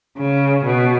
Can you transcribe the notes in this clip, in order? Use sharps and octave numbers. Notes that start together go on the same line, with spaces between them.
C#3
B2